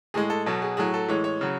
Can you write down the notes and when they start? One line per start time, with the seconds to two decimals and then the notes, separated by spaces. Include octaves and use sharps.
0.14 A2 G#3 G#4
0.30 A4
0.46 B2 F#3 A4
0.62 G#4
0.77 A2 F#3 G#4
0.94 A4
1.08 A2 E3 G#3 C#5
1.24 C#5
1.41 C#3 F#3